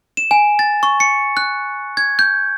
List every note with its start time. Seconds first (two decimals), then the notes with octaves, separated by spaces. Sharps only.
0.17 E7
0.31 G#5
0.59 A6
0.83 C#6
1.00 C#7
1.37 F#6
1.97 G#6
2.19 G6